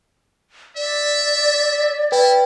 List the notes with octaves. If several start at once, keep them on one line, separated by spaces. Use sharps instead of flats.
D5 E5
E4 B4 G5